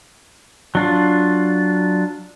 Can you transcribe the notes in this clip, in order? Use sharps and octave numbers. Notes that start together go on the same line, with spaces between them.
F#3 D4 F4